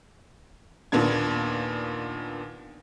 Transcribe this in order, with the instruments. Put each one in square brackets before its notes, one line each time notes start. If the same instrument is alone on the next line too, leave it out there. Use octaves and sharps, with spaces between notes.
[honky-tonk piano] D#2 A#2 B3 D4 G#6